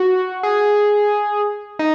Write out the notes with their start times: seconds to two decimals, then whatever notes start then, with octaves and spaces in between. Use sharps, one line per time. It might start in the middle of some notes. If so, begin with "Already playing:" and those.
Already playing: F#4
0.43 G#4
1.79 D#4